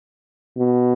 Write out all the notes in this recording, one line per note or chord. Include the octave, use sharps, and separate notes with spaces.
B2